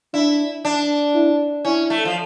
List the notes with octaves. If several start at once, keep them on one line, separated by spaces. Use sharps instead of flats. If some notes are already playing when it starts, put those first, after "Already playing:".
D4 E4
D4
E4
C#4 E4
A3
F3